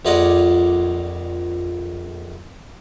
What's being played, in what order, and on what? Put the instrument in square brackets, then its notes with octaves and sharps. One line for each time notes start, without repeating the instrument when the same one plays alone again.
[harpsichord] A#1 F2 F4 D5 D#5 F#5